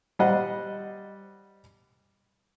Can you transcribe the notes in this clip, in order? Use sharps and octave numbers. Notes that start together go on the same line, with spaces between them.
G3 C5 D#5 F#5